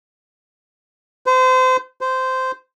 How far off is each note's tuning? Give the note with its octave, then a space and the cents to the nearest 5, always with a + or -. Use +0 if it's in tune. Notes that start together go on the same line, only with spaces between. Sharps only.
C5 -30
C5 -15